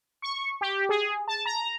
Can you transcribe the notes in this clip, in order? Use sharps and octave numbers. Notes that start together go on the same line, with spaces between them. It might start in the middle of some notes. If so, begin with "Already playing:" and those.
C#6
G4
G#4
A5
A#5